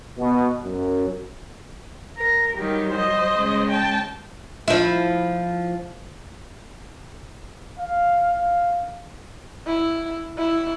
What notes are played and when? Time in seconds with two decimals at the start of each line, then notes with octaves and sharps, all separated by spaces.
0.18 B2
0.64 F#2
2.17 A#4
2.56 D#3 F#3 G3 G4
2.91 C5 D#5
3.35 C#3 G#3
3.70 G5 A5
4.68 F3 E4
7.78 F5
9.67 E4
10.38 E4